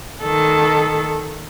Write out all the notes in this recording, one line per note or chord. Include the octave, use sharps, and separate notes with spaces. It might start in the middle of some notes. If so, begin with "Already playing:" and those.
D#3 A4